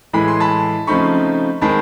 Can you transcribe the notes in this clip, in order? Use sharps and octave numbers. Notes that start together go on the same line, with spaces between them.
A2 E3 G#3 B5
C6
A5 B5
C#3 F3 A3 C4 D#4 B5 C#6
D#3 G#3 C4 A5 B5